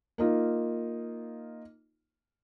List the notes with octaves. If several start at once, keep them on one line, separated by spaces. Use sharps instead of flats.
A#3 D#4 F4